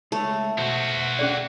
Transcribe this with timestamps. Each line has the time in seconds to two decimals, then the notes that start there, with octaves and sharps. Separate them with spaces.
0.12 G#3 A3 C#5
0.58 B2 F#4 C5
1.19 C#4 G#4 D5